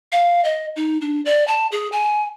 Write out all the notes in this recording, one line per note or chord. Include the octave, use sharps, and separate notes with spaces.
F5
D#5
D#4
D4
D5
A5
G#4
G#5